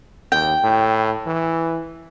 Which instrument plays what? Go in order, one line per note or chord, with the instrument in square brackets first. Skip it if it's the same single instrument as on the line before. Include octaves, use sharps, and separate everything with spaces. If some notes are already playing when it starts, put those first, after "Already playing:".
[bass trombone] D#2 [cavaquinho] G5
[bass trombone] A2
E3